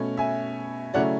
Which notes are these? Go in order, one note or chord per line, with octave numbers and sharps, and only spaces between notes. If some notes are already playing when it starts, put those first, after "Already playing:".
Already playing: B2 A3 C#4
E5 G#5
C#3 F#3 A3 C#4 E4 D5 F#5